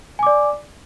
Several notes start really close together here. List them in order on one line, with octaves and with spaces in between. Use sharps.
G#5 D6 D5